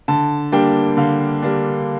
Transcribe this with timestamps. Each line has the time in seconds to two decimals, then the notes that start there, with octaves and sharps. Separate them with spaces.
0.08 D3 A5
0.52 G3 A#3 D4 G5
0.97 D3 F5
1.43 G3 A#3 D4